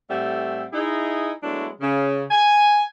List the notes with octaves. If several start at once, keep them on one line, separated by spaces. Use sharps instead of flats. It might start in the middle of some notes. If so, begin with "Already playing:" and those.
A2 G3 A3 C4 E5 F#5
D#4 E4 G#4
F#3 G#3 A3 B3 D4 E4
C#3
G#5